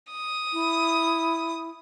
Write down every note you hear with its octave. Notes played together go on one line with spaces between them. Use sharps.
D#6
E4